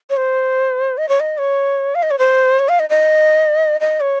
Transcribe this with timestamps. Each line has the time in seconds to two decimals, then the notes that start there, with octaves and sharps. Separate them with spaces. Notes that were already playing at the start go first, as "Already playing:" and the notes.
0.10 C#5
0.17 C5
0.97 D#5
1.09 C#5
1.20 D#5
1.38 C#5
1.95 F5
2.03 D#5
2.11 C#5
2.19 C5
2.59 C#5
2.69 F5
2.79 D#5
2.90 D#5
3.81 D#5
4.00 C#5